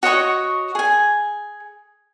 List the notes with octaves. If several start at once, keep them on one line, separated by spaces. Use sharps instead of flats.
F#4 C#5 D#5 C#6
G#4 G#5